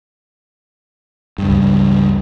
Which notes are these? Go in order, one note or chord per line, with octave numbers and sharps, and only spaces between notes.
C#2 G2